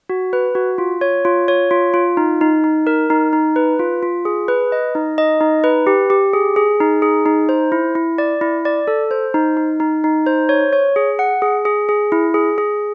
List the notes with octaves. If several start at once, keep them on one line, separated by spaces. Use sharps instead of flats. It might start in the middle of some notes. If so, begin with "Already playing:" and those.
F#4
B4
F#4
F4
C#5
F4
C#5
F4
F4
D#4
D#4
D#4
A#4
D#4
D#4
B4
F4
F4
G#4
B4
D#5
D#4
D#5
D#4
B4
G4
G4
G#4
G#4
D#4
G#4
D#4
C5
E4
E4
D5
E4
D5
A4
C5
D#4
D#4
D#4
D#4
C5
C#5
C#5
G#4
F#5
G#4
G#4
G#4
E4
G#4
G#4